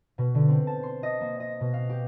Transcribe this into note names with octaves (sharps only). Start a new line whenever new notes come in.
B2
D3
C4
A5
C6
D#5
A#3
D#5
B2
F5
G4